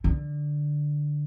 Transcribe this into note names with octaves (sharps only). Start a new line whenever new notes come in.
D3